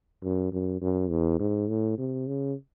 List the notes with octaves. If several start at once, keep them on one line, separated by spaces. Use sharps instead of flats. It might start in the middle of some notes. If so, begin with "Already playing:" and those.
F#2
F#2
F#2
E2
G#2
A2
C3
C#3